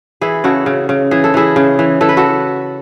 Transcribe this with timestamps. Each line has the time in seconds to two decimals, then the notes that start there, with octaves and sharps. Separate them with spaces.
0.21 E3 E4 G#4
0.44 C#3 F#4 A4
0.66 C#3
0.89 C#3
1.11 E3 G#4
1.24 A4
1.34 E3 E4 G#4
1.56 C#3
1.79 E3
2.01 E3 A4
2.09 B4
2.17 F#4 A4